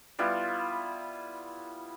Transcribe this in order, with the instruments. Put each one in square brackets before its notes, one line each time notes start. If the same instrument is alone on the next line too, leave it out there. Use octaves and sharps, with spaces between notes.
[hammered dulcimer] G3 B3 E4 F4